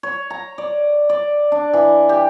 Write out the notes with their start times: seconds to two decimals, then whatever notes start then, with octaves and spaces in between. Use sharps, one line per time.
0.03 C#5
0.30 A#5
0.58 D5
1.09 D5
1.52 D4
1.73 E3
2.09 G4